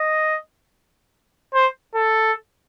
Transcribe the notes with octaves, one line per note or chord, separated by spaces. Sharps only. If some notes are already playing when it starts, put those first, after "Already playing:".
Already playing: D#5
C5
A4